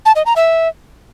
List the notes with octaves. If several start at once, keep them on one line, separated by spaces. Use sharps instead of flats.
A5
D#5
A#5
E5